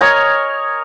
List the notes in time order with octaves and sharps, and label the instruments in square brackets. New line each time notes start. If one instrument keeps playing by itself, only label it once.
[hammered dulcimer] A#4 C#5 D#5 G#5